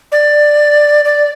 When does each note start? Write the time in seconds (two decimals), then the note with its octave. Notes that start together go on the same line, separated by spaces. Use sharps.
0.12 D5
1.05 D5